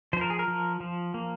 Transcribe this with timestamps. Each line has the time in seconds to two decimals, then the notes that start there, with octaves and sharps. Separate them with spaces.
0.13 F3 C5
0.21 A#4
0.30 G#4
0.39 A#4
0.48 F3
0.80 F3
1.14 A#3